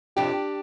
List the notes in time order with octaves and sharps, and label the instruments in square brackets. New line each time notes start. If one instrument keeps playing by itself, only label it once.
[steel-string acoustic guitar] F2 C3 F3 D4 G4